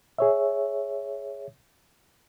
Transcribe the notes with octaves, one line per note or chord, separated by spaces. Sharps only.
G#4 C#5 E5